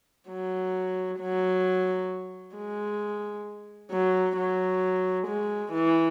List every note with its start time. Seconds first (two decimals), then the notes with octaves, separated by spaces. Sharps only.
0.30 F#3
1.20 F#3
2.56 G#3
3.91 F#3
4.37 F#3
5.27 G#3
5.73 E3